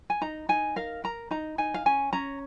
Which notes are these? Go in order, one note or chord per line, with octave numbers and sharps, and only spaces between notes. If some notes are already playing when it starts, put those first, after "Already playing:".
G#5
D#4 A#5
D#4 G#5
A#4 F5
A#4 A#5
D#4 A#5
D#4 G#5
F5
C#4 G#5
C#4 A#5